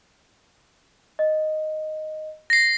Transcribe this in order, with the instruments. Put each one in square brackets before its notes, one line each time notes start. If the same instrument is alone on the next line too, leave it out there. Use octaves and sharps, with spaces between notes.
[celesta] D#5
[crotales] A#6 C7